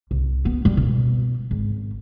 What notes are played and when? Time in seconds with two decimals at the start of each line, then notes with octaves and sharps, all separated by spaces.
0.11 C2
0.45 B3
0.65 G3
0.77 B2
1.51 G#1